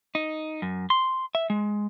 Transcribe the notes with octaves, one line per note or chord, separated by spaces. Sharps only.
D#4
F#2
C6
E5
G#3